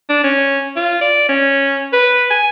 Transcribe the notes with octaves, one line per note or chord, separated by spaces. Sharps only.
D4
C#4
F4
D5
C#4
B4
G#5